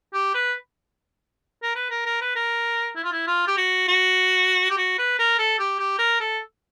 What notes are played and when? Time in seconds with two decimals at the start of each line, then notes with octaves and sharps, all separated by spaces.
0.14 G4
0.34 B4
1.63 A#4
1.75 B4
1.90 A#4
2.06 A#4
2.21 B4
2.36 A#4
2.96 E4
3.04 F4
3.12 E4
3.27 F4
3.47 G4
3.57 F#4
3.88 F#4
4.70 G4
4.78 F#4
4.99 B4
5.19 A#4
5.39 A4
5.59 G4
5.79 G4
5.99 A#4
6.20 A4